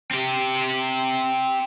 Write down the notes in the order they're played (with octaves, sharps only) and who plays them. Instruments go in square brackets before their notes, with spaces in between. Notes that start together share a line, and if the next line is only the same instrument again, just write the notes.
[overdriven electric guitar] C4 G4